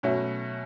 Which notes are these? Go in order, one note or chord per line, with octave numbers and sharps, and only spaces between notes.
B2 F#3 A3 C#4